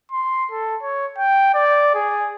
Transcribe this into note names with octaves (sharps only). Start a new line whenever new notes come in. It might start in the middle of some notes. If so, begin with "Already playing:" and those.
C6
A4
C#5
G5
D5
G#4